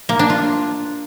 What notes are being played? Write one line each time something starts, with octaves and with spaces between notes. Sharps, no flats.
A#3
D4
F4